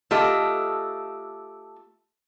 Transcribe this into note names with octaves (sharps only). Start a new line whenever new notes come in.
A3 F4 G4 A4 D#5